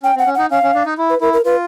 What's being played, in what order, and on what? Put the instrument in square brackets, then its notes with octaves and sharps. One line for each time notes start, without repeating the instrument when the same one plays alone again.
[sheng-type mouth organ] C#4 [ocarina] G5
[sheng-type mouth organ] C4 [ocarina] F#5
[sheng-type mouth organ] C#4
[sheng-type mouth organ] D#4 [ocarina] F#5
[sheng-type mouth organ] C#4 [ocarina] F5
[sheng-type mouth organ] C#4
D4
D#4
E4
[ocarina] B4
[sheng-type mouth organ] E4 [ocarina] A#4
[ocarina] A#4
[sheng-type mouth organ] F4 [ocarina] B4